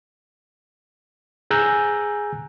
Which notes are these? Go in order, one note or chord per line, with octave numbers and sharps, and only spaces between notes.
G#4 G#5 A#5 E6 F#6 G6